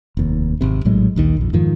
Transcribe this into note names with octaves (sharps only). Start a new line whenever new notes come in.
F1 D#2
G#1 C3
A#1 A2 F#3 G#3
A#1 D#2 D#3
A#1 F2
F2 G#2 D#3 F3